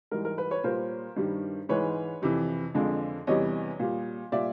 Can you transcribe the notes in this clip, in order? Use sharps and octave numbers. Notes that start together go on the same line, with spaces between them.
G#2 E3 G3 A#4
A#4
B4
B4 C#5
A#2 G3 A#4 C5
G2 D#3 G3
G#2 E3 G#3 B4 C#5
F2 C3 E3
F2 D3 F3 G#3
E2 C3 E3 G3 C#5 D#5
A#2 G3
A#2 G3 D5 E5